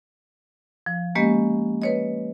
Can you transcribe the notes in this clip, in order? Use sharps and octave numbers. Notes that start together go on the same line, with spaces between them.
F3
G#3 A#3 B3 C#4 G4 D#5
B4 C#5 D#5